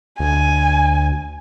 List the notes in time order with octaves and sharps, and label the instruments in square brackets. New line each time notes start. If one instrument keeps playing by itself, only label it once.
[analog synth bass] D2 [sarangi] G#5